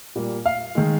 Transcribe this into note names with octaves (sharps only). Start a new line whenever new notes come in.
A#2 G3 A#3
F5
D#3 G#3